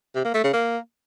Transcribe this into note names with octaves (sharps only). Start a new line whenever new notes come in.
C3
A#3
A3
C#3
A#3